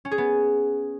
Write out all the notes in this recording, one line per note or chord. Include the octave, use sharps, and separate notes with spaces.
C#4
G#4
B3